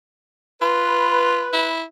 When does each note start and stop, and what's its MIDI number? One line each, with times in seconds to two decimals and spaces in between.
0.62 1.47 65
0.62 1.75 71
1.53 1.83 64